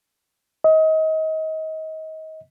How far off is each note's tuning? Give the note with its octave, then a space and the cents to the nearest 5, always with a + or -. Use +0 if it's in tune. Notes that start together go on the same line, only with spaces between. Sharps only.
D#5 +30